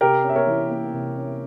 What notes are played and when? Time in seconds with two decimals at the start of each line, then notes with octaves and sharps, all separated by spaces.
0.01 C3 G4 A#4
0.24 C#4
0.29 E5
0.36 A#4 C#5
0.47 E3
0.70 A#3
0.93 C3
1.17 C#4